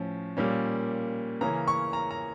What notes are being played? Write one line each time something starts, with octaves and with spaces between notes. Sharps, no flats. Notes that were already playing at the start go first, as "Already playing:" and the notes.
Already playing: A2 F3 C#4
A#2 G3 A#3 C#4
C#3 E3 A#3 C#4 A#5
C#6
A#5
A#5